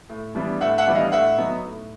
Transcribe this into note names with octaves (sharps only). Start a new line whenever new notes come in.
A2
E3 G3 B3 D4
A2 E5 F#5
E5 F#5
E3 G3 B3 D4
D#5 F5
A2 E5 F#5
F#3 B3 D#4
A2